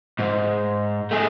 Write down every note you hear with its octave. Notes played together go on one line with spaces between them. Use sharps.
G#2
A3 G#4